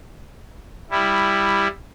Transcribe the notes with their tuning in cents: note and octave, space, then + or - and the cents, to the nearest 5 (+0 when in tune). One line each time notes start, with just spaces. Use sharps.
G3 +10 E4 +0